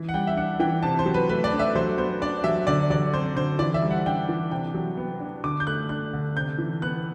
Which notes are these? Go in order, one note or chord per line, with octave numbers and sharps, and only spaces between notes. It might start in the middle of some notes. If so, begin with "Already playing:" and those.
Already playing: E3
F#5
G3 G5
E5
D4 F#5
E3 G5
C3 A5
C5
F#3
B4
A3 B4
D5
D4
E5
F#3 C5
B3 C5
D4 D5
F#3 E5
D3 D5
F#3 D5
C4 C5
D3 C5
E3 D5
E5
G3
F#5
D4 G5
E3
C3 G5
F#3
B3
D4
D3 D6
G6
A3 F#6
D4 F#6
D3
C3 G6
E3
B3 F#6